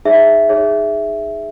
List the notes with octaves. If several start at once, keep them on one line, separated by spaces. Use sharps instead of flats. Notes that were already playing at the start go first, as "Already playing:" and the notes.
D#4 G#4 C#5 E5
D#4 G#4 C#5